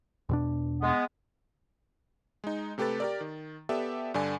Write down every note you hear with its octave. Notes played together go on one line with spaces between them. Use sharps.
E2 B2 D4
G#3 B3
G#3 D#4
C3 A3 G4 A4 B4 A6
G4 A#4 D5
D#3
B3 G4 A4 D5 E5
G2 D3 D5 G#5